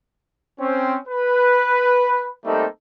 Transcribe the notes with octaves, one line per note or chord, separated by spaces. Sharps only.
C4 C#4
B4
G3 A3 A#3 C4 D#4 A4